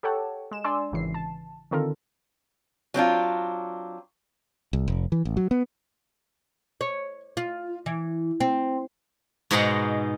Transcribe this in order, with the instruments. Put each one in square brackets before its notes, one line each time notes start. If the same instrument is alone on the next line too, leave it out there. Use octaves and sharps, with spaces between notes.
[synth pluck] G4 A4 C#5 F#5 G5 A5
G#3 E7
D4 D5 G#5 C6 E6
G#1 C#3 E3 C7
A5
D3 D#3 C4 F4 A4 A#4
[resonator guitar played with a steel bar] F#3 C4 D4 F4
[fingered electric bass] C2
F1
E3
A1
F#3
B3
[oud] C#5
F4
E3
C4
[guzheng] G#2 B2 G#3 D#4 F#5 A#5